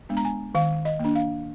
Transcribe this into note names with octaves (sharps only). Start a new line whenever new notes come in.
G#3 B3 D4
A#5
G#5
D#3 F5
D#5
A#3
D4
F5